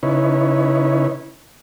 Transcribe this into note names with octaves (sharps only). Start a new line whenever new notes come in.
C#3 D#4 E4 B4 C#5